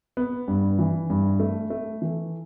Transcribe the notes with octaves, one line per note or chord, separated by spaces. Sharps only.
B3
G2
E3
G2
A3
A3
E3